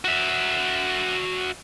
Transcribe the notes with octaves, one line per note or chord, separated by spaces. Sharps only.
F#4 E5